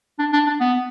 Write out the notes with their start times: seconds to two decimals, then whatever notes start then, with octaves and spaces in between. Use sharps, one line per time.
0.19 D4
0.33 D4
0.47 D4
0.61 B3